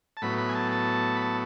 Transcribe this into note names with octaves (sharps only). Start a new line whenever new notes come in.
A5
A2 F#3 B3 B5
B5
G#5
A5
A5
B5
A5